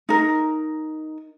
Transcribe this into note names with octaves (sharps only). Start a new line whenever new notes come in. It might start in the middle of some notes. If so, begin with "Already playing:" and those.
D#4 A#4